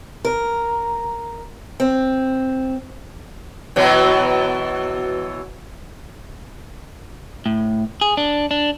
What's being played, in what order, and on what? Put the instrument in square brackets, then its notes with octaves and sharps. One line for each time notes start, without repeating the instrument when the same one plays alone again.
[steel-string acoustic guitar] A#4
C4
[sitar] B2 E3 F#3
[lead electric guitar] A2
G#4
D4
D4